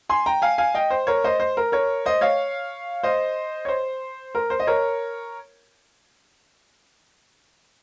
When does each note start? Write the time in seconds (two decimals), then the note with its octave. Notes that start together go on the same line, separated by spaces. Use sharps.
0.09 G#5 C6
0.26 G5 A#5
0.42 F5 G#5
0.58 F5 G#5
0.75 D#5 G5
0.90 C5
1.07 A#4 C#5
1.24 C5 D#5
1.40 C5
1.57 A#4
1.72 A#4 C#5
2.06 C5 D#5
2.21 C#5 F5
3.03 C5 D#5
3.65 C#5
3.68 C5
4.35 A#4
4.50 C5
4.60 D#5
4.67 A#4 C#5